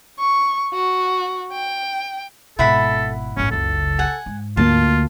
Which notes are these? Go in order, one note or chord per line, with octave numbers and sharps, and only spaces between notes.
C#6
F#4
G5
G#1 B2 E4 A4 F#5 B5
G1 A2 C#4
F#1 C#2 A4
F#5 G#5
G#2
D2 G#3 A#3 F4 A5